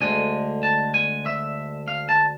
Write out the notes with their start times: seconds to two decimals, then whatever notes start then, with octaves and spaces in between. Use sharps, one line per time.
0.01 D2 D3 G#3 G#5
0.63 A5
0.94 G#5
1.26 E5
1.88 F5
2.09 A5